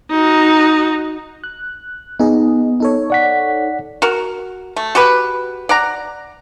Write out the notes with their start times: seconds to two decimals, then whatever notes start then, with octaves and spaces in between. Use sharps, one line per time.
0.10 D#4 F#4
1.44 F#6
2.19 B3 D#4 G#4 D#5
2.80 D#4 A4 C#5
3.10 D5 F#5 B6
4.02 F#4 A#4
4.76 A3
4.95 F#4 G4 B4
5.69 D5 F#5 A#5